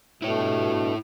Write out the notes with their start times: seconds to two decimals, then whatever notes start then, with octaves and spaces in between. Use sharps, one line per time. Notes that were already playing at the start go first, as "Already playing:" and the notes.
0.22 G2 B2 A3 E4 C#5